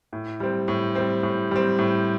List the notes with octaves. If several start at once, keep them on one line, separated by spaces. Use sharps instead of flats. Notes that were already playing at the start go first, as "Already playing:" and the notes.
A2
G3 C4
A2
G3 C4
A2
G3 C4
A2